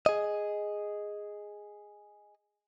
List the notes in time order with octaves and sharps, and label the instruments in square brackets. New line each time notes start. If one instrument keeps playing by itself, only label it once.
[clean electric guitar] G#4 D#5